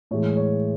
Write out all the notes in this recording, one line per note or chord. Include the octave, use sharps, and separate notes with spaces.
A2 E3 G#3 C#5
C#5